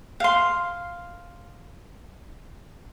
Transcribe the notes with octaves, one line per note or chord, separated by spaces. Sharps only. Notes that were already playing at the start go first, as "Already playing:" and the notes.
F5 C6